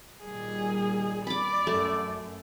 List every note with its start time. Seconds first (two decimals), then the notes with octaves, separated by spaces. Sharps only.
0.24 A#2 D#3 G3 G#4
1.27 D5 B5 D6
1.67 F#2 A3